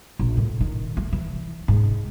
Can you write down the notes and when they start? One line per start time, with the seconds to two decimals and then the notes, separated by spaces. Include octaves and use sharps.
0.19 A#1
0.37 A2
0.61 D#3
0.97 A3
1.13 E3
1.68 G#2